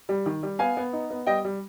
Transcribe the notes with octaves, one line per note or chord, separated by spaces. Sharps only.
G3
D#3
G3
B3 F5 G#5
B3
D#4
B3
G3 D#5 G5
G3